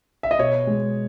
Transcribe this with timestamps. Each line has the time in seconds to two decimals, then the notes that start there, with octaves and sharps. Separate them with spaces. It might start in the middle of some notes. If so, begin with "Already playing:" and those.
0.23 E5
0.31 D#5
0.39 B2 C#5
0.67 G#3